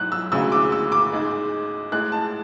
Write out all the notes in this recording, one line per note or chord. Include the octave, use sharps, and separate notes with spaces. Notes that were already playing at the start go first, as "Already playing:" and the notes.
Already playing: G#2 F#3 F#6
E6
D2 C#3 G#3 E6
D6
E6
D6
G#2 G#3
A2 G#3 F#6
A5